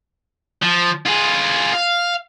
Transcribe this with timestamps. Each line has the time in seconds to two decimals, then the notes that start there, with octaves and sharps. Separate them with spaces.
0.63 F3
1.06 F4 G#4
1.74 F5